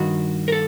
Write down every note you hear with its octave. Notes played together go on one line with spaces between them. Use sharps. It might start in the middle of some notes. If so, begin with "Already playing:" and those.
Already playing: G2 D#3 F#4
A#4
A4